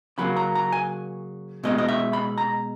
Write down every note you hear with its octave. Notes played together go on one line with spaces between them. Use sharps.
C#3 F#3 A#3 C#4 B5
A#5
A#5
G#5
B2 G#3 C#4 D#5
D#5
E5
B5
A#5